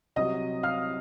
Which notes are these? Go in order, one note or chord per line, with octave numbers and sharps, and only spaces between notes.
C2 C3 F#3 D#5 D#6
F5 F6